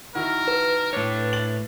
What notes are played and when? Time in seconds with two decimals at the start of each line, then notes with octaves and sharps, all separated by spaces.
0.15 D#3 E4 F#4 A#4
0.48 B4
0.93 A2 D4 C#5
1.33 A6 F#7